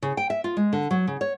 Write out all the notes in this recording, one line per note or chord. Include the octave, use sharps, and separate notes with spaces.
C#3
G5
E5
F4
G#3
D3
F#3
C#3
C#5